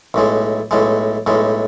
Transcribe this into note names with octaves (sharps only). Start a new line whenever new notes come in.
B1 A2 G#3
B1 A2 G#3
B1 A2 G#3